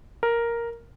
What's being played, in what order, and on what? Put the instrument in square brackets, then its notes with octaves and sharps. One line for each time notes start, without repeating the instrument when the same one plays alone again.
[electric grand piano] A#4